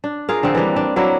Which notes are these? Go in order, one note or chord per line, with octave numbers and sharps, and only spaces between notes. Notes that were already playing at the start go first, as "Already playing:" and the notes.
D4
F4 G#4 A#4 F5
D3 F3 C4
E3 G3 A#3 D4
D4
F#3 A#3 D4 E4